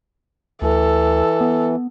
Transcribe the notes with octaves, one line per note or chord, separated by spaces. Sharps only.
D2 E3 A4
B3